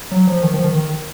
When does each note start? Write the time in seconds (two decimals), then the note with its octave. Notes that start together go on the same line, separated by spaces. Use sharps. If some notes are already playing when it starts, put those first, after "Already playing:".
0.11 F#3
0.27 F3
0.43 D#3
0.54 F3
0.64 D#3
0.75 D#3